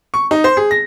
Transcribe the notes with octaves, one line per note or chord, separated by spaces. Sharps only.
C#6
D#4
C5
G#4
A#6